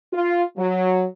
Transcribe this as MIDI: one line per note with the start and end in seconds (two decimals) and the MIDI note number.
0.13 0.43 65
0.57 1.05 54